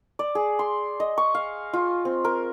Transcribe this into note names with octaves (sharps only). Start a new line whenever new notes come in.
D5
G#4
C6
D#5
C#6
F5
F4
C4
A#4